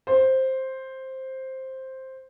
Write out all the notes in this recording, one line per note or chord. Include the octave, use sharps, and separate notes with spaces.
C5 C6